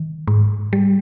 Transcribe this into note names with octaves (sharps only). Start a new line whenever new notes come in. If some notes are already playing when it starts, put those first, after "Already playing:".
Already playing: D#3
G#2
G3